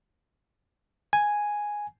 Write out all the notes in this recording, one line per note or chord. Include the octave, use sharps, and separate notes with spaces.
G#5